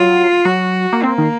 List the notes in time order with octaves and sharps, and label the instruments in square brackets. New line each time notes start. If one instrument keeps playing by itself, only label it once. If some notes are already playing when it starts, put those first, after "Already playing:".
Already playing: [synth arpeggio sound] F#3 [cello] F4
[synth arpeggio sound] F#3 [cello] F#4
[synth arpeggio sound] A#3
[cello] A#3 [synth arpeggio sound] C4
[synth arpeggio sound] D#3